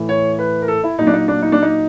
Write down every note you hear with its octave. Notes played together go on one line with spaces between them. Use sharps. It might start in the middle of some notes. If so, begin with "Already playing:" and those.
Already playing: A2 E3
C#5
B4
A#4
A4
E4
A#2 F#3 D#4
D4
D#4
D4
D#4
D4
D#4